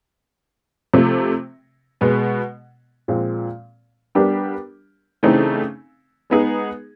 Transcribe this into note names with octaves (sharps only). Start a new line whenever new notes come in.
C3 F3 A3
B2 G#3 B3
A#2 F3 G#3 C4
G3 B3 D4 G4 A#4
C#3 E3 A3 C4 D#4
G#3 B3 D#4 G#4